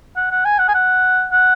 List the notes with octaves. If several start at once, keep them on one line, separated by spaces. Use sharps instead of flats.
F#5
F#5
G#5
F#5
G#5
F#5
F#5